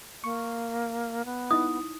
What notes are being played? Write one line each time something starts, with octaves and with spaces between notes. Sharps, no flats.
A#3 C#6
B3
D#4 E4 D#6